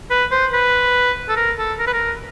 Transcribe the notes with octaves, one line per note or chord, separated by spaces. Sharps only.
B4
C5
B4
A4
A#4
A4
A#4
B4
A#4